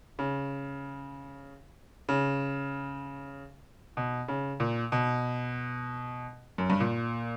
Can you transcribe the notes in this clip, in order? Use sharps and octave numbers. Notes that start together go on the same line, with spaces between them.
C#3
C#3
B2
C#3
A#2
B2
F#2
G2
A#2